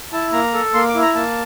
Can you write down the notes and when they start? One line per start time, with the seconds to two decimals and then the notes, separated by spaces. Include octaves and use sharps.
0.13 E4 A5
0.33 A#3 A#5
0.54 A4
0.74 A#3 C6
0.88 D6
0.95 E4
1.02 A#5
1.15 A#3 A5